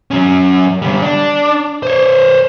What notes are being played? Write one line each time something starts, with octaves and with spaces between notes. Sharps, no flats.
F#3 C#4
D3 G3
D4
C5 C#5